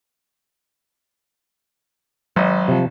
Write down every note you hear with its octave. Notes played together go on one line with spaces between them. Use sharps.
G#1 F#3 D#5
C3 F3